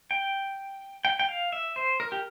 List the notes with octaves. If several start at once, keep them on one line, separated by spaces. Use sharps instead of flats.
G5
G5
G5
F5
E5
C5
A#4
G4